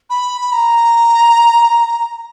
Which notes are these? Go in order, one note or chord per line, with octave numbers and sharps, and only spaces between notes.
B5
B5
A#5